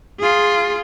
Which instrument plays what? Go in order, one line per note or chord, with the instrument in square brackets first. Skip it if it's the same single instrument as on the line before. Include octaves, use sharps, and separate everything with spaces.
[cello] F4 G#4